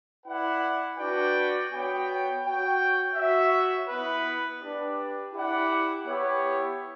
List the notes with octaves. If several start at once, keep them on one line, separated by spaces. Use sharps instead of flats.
E4 B4 D5 F#5
D4 F#4 B4 D5 G5
B3 F#4 C#5 G5
F#4 C#5 G5
F#4 C#5 E5
B3 E4 B4
D4 G4 B4 D5
E4 G4 D5 F#5
B3 E4 G4 C#5